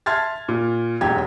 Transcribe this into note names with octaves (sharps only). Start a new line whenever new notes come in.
E5 A5 C6 F6 G#6 A6
A#2
E1 B1 F#2 G4 G#6